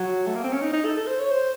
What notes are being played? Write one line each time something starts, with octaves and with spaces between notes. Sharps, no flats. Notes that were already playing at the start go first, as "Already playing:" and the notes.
Already playing: F#3
A3
A#3
C4
C#4
D#4
D#4
A4
A4
C5
C#5
C5